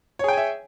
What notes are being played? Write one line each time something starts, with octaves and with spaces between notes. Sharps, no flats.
G#4 C#5 E5 G5 G#5